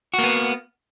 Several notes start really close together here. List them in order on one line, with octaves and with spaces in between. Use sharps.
F#4 A#3 B3